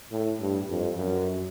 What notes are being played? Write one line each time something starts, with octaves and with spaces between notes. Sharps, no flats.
A2
G2
F2
F#2